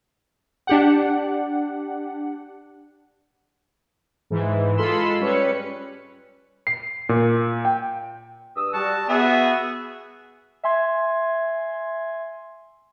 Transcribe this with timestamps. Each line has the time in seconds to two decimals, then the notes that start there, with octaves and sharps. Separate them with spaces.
0.67 D4 G4 F#5
4.30 G#2 E3
4.77 G#3 F4 A4 B5 C6 E6
5.20 G3 C#4 B4 C#7
6.67 C7
7.09 A#2
7.65 G5
8.56 G2 D#6 E6
8.74 G3 F#4 A5
9.09 B3 F#4 G#4 E5
10.63 E5 G#5 C6 G#6